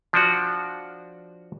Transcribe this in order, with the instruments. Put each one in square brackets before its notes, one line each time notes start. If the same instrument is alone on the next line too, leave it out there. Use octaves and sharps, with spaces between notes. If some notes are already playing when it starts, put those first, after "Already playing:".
[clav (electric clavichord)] F3 D4 F#4